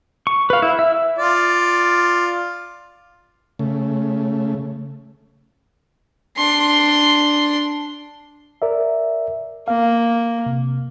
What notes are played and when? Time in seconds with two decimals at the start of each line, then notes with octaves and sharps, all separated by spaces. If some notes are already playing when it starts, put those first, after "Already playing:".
0.27 C#6
0.50 B4 F5
0.62 E4
0.79 E5
1.19 F4 D5
3.59 C#3 A3
6.37 D4 C6
8.62 A#4 D5 E5
9.68 A#3 F5
10.46 C3